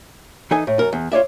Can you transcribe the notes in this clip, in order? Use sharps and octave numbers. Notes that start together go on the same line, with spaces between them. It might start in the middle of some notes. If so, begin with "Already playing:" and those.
E3 D#4 A4 D#5 G#5
A2
F#2 A#4
E2
F4 C#5 D5 E5